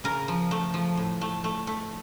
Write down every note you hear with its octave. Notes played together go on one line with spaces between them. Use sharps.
C#3 A#4
F3
A3
F3
A2
A3
A3
A3